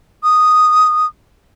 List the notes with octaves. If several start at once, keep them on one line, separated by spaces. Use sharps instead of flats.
D#6